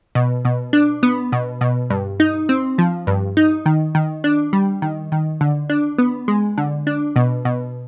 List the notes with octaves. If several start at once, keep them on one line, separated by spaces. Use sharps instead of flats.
B2
B2
D4
B3
B2
B2
G2
D#4
C4
F3
G2
D#4
D#3
D#3
D4
G3
D#3
D#3
D3
D4
B3
G#3
D3
D4
B2
B2